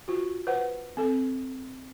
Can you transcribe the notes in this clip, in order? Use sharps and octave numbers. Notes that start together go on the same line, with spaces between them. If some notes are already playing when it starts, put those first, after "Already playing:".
F4 F#4
B4 C5 F#5
C4 A4